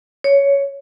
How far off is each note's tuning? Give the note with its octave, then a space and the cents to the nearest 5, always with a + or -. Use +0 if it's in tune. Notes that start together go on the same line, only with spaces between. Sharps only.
C#5 +10